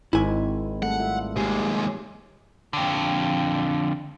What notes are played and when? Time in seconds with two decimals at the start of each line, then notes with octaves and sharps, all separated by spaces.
0.13 G#1 G#3 C4 D#4 E4 G#5
0.83 G3 A3 A4 F#5
1.00 F4 E5
1.36 D#2 G#3 G4
2.73 F2 D3